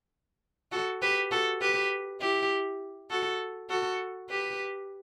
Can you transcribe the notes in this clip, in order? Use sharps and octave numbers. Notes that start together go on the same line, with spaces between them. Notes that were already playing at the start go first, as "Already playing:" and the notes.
F#4 A4
G4 B4
F#4 A4
G4 B4
E4 G4
F#4 A4
F#4 A4
G4 B4